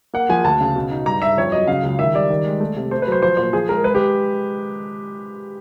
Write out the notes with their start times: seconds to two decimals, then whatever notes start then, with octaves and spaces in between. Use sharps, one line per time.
0.14 A#3 F#5
0.29 F3 G#5
0.44 D2 A5
0.61 C#3
0.76 B2
0.91 D#4
1.06 G2 A#5
1.21 G2 E5
1.37 F2 C#5
1.52 F#3 D#5
1.67 C#3 F5
1.83 C#2
1.99 D#3 E5
2.14 G3 D5
2.30 D#3
2.46 G#3
2.60 A3
2.76 C3
2.91 A3 C5
3.02 B4
3.07 F#3 C5
3.22 F3 C5
3.37 A#2 C5
3.53 F3 G#4
3.69 G#3 A#4
3.84 G#3 B4
3.95 G4